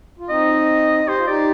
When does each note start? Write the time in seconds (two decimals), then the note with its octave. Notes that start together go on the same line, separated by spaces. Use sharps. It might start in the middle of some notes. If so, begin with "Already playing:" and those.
0.19 F4
0.29 C4 D#4 D#5
1.08 G4 C5
1.17 F4
1.27 D#4 G4 D5